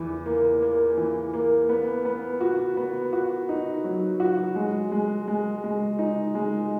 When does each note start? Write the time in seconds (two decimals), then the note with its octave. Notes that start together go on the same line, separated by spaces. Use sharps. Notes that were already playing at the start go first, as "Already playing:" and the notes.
Already playing: E2 E3
0.26 A#3
0.62 A#3
0.98 E3
1.33 A#3
1.69 B3
2.05 B3
2.41 F#4
2.77 B3
3.13 F#4
3.49 D#4
3.84 F#3
4.20 F#4
4.56 G#3
4.92 G#3
5.28 G#3
5.64 G#3
5.99 D#4
6.35 G#3